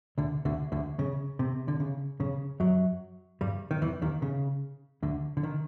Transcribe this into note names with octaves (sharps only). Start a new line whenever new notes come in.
D2 D3
D2 D3
D2 D3
C#3
C3
D3
C#3
C#3
F#2 F#3
G2 G3
D#3
E2 E3
D#2 D#3
C#3
D2 D3
D3
D#3